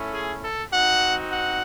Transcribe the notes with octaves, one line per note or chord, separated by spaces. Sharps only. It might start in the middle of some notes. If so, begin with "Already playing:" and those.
Already playing: A3 C#4 E4
G#4
A4
C4 D#4 F#4 F#5
F#5